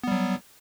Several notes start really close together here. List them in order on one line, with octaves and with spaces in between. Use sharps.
B3 G3 F#3